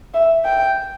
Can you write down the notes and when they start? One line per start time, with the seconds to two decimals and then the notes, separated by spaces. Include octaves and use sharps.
0.14 E5
0.45 G5